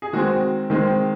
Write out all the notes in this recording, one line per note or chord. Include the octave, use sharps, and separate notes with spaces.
G#4
D#3 G#3 C4 F#4
D#3 G#3 C4